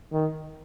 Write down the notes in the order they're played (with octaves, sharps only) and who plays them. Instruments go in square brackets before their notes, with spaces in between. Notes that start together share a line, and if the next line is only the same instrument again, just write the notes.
[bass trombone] D#3